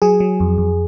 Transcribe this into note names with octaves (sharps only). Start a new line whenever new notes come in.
F#3 G#4
F#3
F2
F2